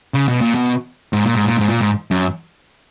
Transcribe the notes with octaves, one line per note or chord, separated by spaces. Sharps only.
C#3
B2
A#2
B2
G#2
A#2
G#2
A#2
G#2
A#2
G#2
F#2